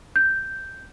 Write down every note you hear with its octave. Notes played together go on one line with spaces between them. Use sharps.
G6